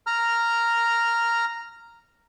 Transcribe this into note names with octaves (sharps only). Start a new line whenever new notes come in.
A#5 F6